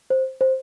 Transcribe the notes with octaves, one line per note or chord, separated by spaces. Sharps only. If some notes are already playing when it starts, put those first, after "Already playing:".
C5
C5